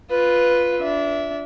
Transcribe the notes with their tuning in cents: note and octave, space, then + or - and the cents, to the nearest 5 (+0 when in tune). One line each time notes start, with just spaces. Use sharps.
F4 +0 B4 +0
D4 -20 E5 +0